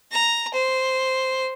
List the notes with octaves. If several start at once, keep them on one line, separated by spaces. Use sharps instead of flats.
A#5
C5